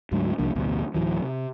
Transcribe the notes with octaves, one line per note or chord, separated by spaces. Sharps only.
D2 G#2 F#3
C2 F3 A#3 D4
A1 D2 B2 G3
D1 D#2 E3 F#3
C3